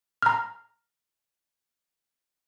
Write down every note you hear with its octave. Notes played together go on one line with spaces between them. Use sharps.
A#5 F6